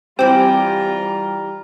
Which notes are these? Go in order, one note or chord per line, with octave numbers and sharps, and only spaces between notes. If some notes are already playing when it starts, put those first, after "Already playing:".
E3 G3 C4 F4 G4 A#5